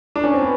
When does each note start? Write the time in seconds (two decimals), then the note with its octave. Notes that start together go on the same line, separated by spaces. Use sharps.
0.16 D4
0.24 C#4
0.33 C4
0.42 B3